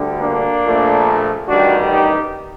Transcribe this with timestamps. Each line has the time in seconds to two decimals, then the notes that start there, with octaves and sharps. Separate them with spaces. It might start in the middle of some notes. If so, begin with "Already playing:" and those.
Already playing: D2 D3 G3
0.20 A#3 D4
0.63 A#1 A#2 A3
1.48 A1 G2 D#3 G3 D4 F#4
1.90 D#4 G4